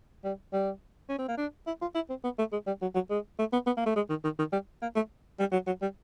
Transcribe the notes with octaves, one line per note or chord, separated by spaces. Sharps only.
G3
G3
C#4
C4
A#3
D4
E4
F4
E4
C4
B3
A3
G#3
G3
F#3
F#3
G#3
A3
B3
B3
A#3
A3
G#3
D#3
D#3
D#3
G3
A#3
A3
G3
F#3
F#3
G3